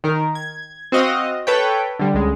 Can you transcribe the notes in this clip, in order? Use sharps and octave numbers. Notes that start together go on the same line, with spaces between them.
D#3 A#4
G#6
C4 F#4 D#5 F5
A4 B4 C#5 G5
D3 G3
C#2 G#3